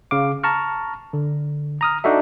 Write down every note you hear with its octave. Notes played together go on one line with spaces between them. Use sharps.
C#3 F5 D6
A5 A#5 C#6 F6
D3
A#5 D#6 F6
D4 D#4 F#4 A4 E5